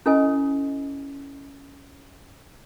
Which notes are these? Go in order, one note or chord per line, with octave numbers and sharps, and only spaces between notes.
C#4 E4 A4 D#5 G#5